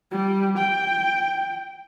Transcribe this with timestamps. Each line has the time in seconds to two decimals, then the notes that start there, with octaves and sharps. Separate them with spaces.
0.11 G3
0.58 G5